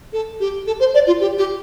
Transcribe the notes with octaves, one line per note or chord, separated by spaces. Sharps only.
A4
G4
A4
C5
D5
F4
G4
G4